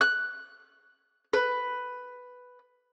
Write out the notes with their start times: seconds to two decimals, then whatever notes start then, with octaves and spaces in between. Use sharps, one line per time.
0.01 F#6
1.33 B4